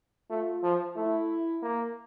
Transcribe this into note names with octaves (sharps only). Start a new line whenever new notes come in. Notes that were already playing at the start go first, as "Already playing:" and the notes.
A3 F4
F3
A3 E4
A#3